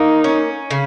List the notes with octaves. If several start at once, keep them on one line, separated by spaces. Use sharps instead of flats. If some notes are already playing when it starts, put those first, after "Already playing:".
Already playing: A#3 D#4
C#4
C#3